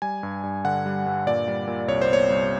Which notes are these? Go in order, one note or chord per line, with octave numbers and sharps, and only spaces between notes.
G3 G#5
G2
G2
D3 F#5
G3
G2
A#2 D5
G3
A#2
C2 C#5
C5
B3 C#5
C2